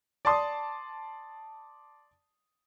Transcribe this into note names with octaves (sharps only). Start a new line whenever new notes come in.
D5 A5 C6 D#6